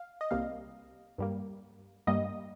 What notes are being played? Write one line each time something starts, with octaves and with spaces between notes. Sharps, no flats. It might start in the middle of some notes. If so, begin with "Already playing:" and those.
Already playing: F5
D#5
C2 C3 G3 A#3 F5
G2 G3 A#3
G2 G3 A#3 D#5